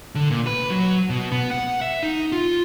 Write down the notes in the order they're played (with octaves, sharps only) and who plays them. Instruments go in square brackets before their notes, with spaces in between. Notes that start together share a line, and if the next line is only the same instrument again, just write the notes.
[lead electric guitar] D3
A#2
B4
F#3
B2
B3
F#5
E5
D#4
F4